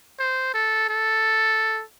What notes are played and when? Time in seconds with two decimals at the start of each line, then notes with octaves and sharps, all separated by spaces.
0.19 C5
0.54 A4
0.89 A4